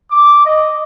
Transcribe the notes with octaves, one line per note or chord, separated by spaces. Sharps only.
D6
D#5